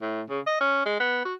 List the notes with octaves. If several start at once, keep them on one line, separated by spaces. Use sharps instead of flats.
A2
C#3
D#5
C#4
G#3
B3
F#4